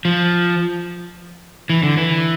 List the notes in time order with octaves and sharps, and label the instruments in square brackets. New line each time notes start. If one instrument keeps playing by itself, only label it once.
[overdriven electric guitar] F3
E3
D3
E3